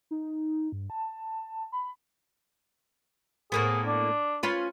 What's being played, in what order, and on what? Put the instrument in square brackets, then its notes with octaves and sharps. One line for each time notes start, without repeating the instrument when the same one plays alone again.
[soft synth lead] D#4
G2
A5
B5
[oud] A2 A#3 B3 [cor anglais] G#4
[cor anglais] D4
[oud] C#4 F4 B4